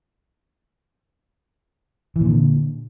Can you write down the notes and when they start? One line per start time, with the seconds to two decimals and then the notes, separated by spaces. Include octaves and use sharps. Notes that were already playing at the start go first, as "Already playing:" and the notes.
2.16 E3
2.21 A#2
2.26 D3